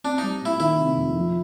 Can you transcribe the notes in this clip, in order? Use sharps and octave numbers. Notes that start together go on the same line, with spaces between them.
C4 D4
G3 D#4
A#2 E4
D#3 E4
C3
F2
F3